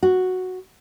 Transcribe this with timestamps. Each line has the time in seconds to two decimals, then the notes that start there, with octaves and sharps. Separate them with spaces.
0.03 F#4